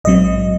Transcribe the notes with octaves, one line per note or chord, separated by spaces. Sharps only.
A#1 G#2 F#3 C4 D#5